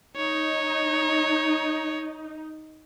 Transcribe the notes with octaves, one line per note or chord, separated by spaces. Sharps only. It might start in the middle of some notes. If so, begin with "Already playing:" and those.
D#4 C#5